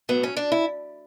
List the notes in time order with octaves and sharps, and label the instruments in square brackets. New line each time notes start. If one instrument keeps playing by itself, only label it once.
[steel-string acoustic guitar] A2 F#3 B3
C#4
D4
E4